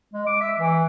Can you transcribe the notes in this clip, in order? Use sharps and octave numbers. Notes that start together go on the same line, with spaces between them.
G#3
D6
E5
E3